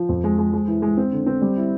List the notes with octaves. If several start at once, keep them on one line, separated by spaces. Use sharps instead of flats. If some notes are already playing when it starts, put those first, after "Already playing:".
Already playing: F3
F2
G#3
G#3
G#3
E3
G#3
C4
D3
C4
G3
E4